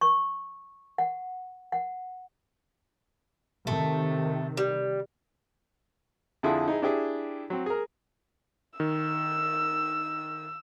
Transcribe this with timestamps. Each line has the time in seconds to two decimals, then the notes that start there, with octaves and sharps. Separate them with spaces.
0.01 C#6
0.98 F#5
1.72 F#5
3.67 C3 D#3 A3
4.57 G3
6.43 F2 D3 F3 E4 G#4 D#6
6.68 D#4 E4 G#4
6.82 D4 E4 G4 G#4
7.50 F#3 C4
7.66 G#4 A#4
8.80 D#3 E6